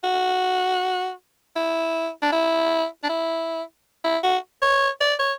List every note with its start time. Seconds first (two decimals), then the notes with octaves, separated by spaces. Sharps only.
0.04 F#4
1.56 E4
2.23 D4
2.32 E4
3.04 D4
3.09 E4
4.05 E4
4.23 F#4
4.62 C#5
5.01 D5
5.19 C#5